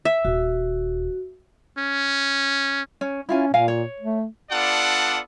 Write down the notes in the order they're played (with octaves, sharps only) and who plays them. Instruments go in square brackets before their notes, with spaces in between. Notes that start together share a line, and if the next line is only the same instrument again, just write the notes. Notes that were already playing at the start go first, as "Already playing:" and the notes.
[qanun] E5
[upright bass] D#1 [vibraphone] F#4
[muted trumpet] C#4
[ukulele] C#4
[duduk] C#4 [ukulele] E4 F4 G#5
[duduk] A#2 [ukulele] A#4 F5 G#5
[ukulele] C#5
[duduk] A3
[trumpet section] B3 D4 F4 A4 D5 F#5